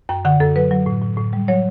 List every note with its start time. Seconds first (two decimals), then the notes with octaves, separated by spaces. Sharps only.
0.09 F#2 G5
0.25 D3 F#5
0.40 F#2 A4
0.56 F#3 B4
0.71 F#3
0.86 A2
1.02 A2
1.17 A2
1.33 G3
1.48 F#3 C#5